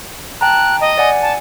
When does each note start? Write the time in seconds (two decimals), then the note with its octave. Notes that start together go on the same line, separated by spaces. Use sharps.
0.41 G5 A5 A#5 F#6
0.81 D#5
0.98 D5 F#5 G#5
1.22 A5